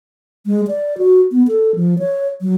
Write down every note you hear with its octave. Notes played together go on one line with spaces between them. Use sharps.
G#3
D5
F#4
B3
A4
F3
C#5
F#3